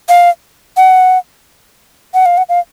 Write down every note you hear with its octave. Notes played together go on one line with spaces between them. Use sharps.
F5
F#5
F#5
F5
F#5
F5